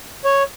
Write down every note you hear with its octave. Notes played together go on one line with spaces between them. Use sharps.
C#5